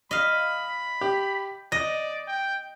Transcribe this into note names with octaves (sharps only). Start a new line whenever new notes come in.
D#5 F5 B5
G4
D5 D#5 A#6
G5